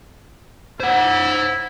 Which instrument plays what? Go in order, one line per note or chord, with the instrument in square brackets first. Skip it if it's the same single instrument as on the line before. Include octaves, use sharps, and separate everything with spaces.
[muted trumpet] E4 [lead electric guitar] C5 F#5